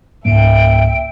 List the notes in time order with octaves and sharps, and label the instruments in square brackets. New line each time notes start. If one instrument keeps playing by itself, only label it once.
[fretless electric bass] C#2 G#2 A#3 [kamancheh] E5 G5 [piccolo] D7